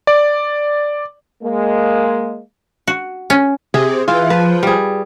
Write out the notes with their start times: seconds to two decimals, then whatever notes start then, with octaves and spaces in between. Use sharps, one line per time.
0.07 D5
1.43 G#3 A#3
2.87 F#4
3.30 C#4
3.74 C3 G#4
4.08 E3 F4
4.30 F3 B4
4.63 G3 G#4